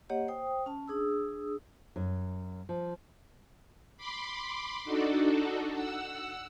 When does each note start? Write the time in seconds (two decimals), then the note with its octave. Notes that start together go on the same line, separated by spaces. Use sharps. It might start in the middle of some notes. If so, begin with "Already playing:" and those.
0.10 A#3 G4 C#5 D#5 F#5
0.28 C5 G5 D#6
0.66 C#4 A5
0.88 D4 G#4 D#6 E6
1.96 F#2
2.69 F3
3.97 B5 C6 D6
4.85 D4 D#4 F#4 A4
5.71 F#5 E6